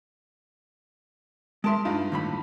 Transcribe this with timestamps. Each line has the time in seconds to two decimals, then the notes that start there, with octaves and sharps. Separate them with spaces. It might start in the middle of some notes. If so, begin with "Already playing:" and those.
1.64 G#3 A#4 E5 A5 C6
1.85 G2 D#4 F4
2.12 D#2 A2 B5